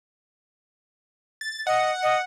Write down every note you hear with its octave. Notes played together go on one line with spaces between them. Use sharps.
A6
D#5 F#5
D#5